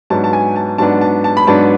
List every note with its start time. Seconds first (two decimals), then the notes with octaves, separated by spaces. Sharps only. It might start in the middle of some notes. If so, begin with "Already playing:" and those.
0.10 G#2 F#3 B3 D4 A5
0.24 A5
0.33 G#5
0.56 A5
0.78 G#2 F#3 B3 D4 A5
1.01 A5
1.24 A5
1.37 B5
1.47 G#2 F#3 B3 D4 A5